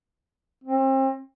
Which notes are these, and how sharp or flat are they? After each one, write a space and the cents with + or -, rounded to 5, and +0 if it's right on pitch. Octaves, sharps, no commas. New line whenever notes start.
C4 +35